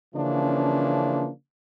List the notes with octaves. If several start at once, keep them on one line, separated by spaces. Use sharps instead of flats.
C#3 E3 F3 A#3 C#4 D4